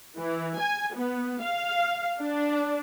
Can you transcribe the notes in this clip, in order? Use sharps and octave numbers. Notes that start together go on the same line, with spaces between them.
E3
G#5
B3
F5
D4